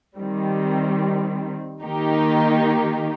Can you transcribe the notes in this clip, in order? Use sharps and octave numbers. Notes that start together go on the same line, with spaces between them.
D#3 G3 C4
D#3 A#3 D#4 G4